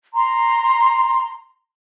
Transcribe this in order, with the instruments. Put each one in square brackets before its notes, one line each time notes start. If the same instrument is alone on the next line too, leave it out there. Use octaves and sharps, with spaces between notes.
[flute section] A#5 C6